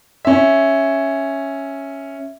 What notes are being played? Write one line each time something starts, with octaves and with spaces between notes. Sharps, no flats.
C#4 E5